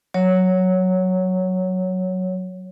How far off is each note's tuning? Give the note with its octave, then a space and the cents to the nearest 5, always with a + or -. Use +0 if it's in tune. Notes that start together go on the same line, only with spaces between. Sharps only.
F#3 +0 C#5 +0